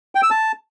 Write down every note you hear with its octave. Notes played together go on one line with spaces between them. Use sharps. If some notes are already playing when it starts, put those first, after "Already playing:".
G5
E6
A5